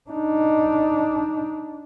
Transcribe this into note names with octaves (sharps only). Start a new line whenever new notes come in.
D4 D#4